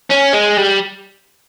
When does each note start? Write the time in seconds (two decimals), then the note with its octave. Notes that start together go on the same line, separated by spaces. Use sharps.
0.11 C#4
0.34 G#3
0.58 G3